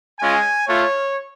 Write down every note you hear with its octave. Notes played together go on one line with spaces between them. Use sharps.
G#3 C#4 F4 G#5
A3 F4 C#5